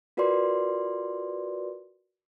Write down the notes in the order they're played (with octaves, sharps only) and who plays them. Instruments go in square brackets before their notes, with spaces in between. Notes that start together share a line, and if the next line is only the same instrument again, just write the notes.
[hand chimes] F4 F#4 A#4 B4 D5 C6